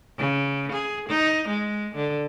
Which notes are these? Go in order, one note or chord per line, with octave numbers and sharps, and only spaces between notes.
C#3
G#4
D#4
G#3
D3